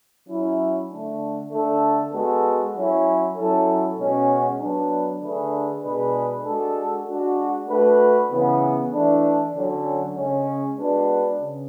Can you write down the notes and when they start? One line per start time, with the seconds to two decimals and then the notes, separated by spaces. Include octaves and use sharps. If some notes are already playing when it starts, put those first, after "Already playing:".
0.28 F#3 C#4 E4
0.89 D3 A3 D4
1.51 D3 A3 D4 A4
2.13 G#3 B3 F#4 A4
2.75 F#3 C#4 E4
3.36 F#3 C#4 E4 A4
3.98 B2 G#3 C#4 F#4
4.60 F#3 B3 D4
5.21 D3 A3 D4 G#4 B4
5.83 B2 G#3 D4 G#4 B4
6.44 G#3 D4 F#4 A4
7.07 G#3 D4 F#4
7.68 A3 D4 F#4 B4
8.30 C#3 E3 B3
8.92 E3 A3 D4
9.54 D3 F#3 C#4
10.15 C#3 G#3 C#4
10.77 G#3 B3 D4 F#4 B4
11.39 C#3